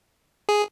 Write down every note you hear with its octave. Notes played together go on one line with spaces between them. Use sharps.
G#4